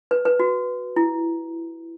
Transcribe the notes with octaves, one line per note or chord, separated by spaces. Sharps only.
B4
B4
F#4
E4